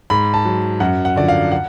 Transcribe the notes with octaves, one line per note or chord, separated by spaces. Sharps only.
G#2 B5
A5
F#3
F#2 F#5
F#5
D3 F3 D5
F5
F#5